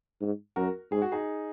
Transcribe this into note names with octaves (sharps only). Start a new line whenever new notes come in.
G#2
F#2 F#4 A#4
G#2 G#4
F#4
D#4 G#4